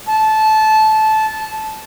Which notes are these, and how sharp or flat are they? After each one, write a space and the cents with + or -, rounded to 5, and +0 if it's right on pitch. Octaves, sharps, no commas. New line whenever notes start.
A5 -15